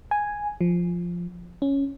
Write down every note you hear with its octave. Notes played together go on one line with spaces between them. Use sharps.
G#5
F3
C#4